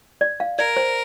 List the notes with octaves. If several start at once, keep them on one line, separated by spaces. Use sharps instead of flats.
D5
F5
A#4 D5
C5